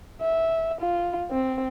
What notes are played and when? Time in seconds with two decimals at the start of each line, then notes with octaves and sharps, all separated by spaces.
0.21 E5
0.81 F4
1.31 C4